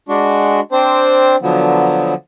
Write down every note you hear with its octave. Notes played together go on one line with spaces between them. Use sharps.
G#3 D4 F#4
C4 D4 C5
D3 F3 F#3 B3